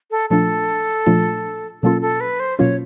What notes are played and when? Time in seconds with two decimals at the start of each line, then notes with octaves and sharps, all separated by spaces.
0.11 A4
0.30 A#2 F3 A3 D4 F4 A4
1.06 A#2 F3 A3 D4 F4
1.82 B2 F#3 A#3 C#4 F4 A4
2.02 A4
2.21 B4
2.40 C5
2.59 B2 F#3 A#3 C#4 F4 C#5